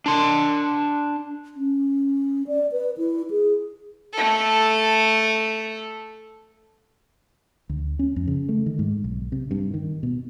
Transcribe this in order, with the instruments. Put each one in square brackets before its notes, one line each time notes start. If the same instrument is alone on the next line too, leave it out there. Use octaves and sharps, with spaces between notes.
[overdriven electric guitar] D4 C6
[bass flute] C#4
D5
B4
E4
G#4
[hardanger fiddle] A3 A4
[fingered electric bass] D2
C#4
F2
C#3
A3
D#3
G#2
B1
C3
G2
D#3
B2